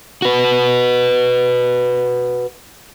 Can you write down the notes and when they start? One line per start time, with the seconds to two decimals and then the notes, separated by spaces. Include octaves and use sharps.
0.22 F#4 B4